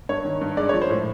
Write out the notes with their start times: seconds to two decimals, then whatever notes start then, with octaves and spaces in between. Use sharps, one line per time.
0.09 G2 C#5
0.25 D#3
0.41 G2
0.57 G#3 D5
0.69 F3 C#5
0.82 C5
0.89 A2